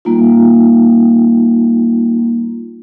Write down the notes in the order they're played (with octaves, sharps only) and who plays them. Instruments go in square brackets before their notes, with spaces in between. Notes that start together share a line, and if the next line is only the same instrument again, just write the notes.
[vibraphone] G3 A#3 D#4 F4